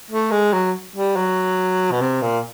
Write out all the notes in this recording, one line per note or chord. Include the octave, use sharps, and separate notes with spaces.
A3
G#3
F#3
G3
F#3
B2
C3
A#2